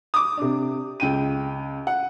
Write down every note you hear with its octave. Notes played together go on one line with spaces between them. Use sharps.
D6 D#6
C3 D4
C#2 G5 D#7
F#5